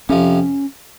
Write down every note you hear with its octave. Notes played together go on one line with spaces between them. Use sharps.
F2 C3 F3 C#4